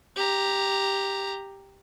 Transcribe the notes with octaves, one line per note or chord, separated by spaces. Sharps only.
G4 A#5